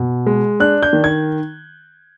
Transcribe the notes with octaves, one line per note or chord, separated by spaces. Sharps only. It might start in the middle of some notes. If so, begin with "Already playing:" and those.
Already playing: B2
G#3
D4 F#6
G6
D#3
G#6